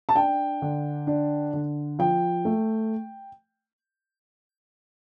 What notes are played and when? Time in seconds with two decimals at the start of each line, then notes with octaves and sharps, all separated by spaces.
0.09 A5
0.16 D4 G5
0.62 D3
1.07 D4
1.53 D3
1.99 F3 G5
2.45 A3